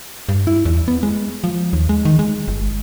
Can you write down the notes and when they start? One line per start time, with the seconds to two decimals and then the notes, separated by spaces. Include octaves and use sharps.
0.29 G2
0.47 E4
0.65 E2
0.88 B3
1.03 G#3
1.44 F3
1.73 D#2
1.89 G#3
2.05 D#3
2.19 G#3
2.48 G1